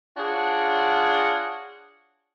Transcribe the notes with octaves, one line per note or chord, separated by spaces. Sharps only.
D4 F4 F#4 G#4 C#5 F#5